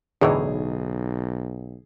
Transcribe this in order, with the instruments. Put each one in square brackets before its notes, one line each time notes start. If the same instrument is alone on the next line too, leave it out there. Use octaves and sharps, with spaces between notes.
[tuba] B1 [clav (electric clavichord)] E2 A2 E3 [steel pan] D3 D#4 C#5 [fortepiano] G#4